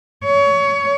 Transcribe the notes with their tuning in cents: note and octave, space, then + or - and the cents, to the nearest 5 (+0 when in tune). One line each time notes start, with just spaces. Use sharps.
C#5 +25